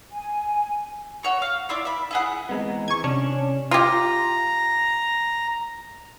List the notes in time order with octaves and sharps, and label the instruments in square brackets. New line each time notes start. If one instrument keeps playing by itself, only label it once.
[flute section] G#5
[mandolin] F#4 C#5 C#6
F5
E4 D5 E5 C6
E5 B5
E4 G#4 F#5
[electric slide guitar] E3 G#3 B3 [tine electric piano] C4 A#5
[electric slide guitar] E3 [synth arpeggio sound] C#6 G#6
[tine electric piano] C3 [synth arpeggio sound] C#4 [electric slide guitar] D4
[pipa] F4 G4 [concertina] A#5